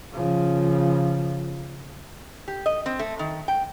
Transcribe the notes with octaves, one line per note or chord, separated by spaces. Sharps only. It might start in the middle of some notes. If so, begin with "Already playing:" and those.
C#3 F3
G4
D#5
C4
A3
D#3
G5